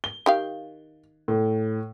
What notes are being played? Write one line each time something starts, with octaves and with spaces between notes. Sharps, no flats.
G7
D#3 G4 F5
A2